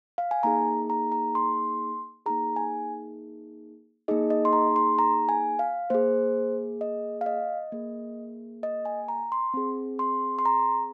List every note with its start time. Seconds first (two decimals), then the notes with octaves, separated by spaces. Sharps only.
0.18 F5
0.31 G#5
0.43 A#3 D#4 G#4 A#5
0.90 A#5
1.12 A#5
1.35 C6
2.26 A#3 D#4 G#4 A#5
2.56 G#5
4.08 A#3 D#4 G#4 D#5
4.30 D#5
4.45 C6
4.53 A#5
4.76 C6
4.99 A#5
5.29 G#5
5.59 F5
5.90 A#3 G#4 C5
6.81 D#5
7.21 F5
7.26 D#5
7.72 A#3 G#4
8.63 D#5
8.85 G#5
9.08 A#5
9.32 C6
9.54 C4 G#4
9.99 C6
10.39 C6
10.45 A#5